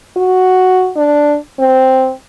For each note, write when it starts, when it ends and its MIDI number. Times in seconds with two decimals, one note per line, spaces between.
0.17 0.91 66
0.96 1.36 62
1.59 2.12 60